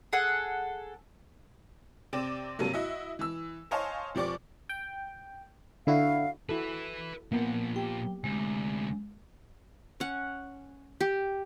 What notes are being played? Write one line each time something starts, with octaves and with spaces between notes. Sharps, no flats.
G#4 A4 F#5
C3 C4 D5 D6 E7
G2 C3 F#3 A#3
E4 F#4 D#5 E5
E3 E6
C5 C#5 D#5 F5 G#5 A5
F1 F3 G4 D5 C#6 D6
G5
D3 E4 F#4 F5
E4 F#4 A4 B4 E5
A#2 F3 A#3 B3
G4 G5
D2 C3 G#3
C#4 F#5
G4